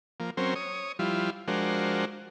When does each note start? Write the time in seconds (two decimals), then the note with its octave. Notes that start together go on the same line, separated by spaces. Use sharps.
0.20 F3 A#3
0.37 F#3 C4 C#4 A#4 C5
0.55 C#5 D#6
0.99 F3 G3 E4 F4
1.48 F3 G#3 D4 F#4 A#4 C5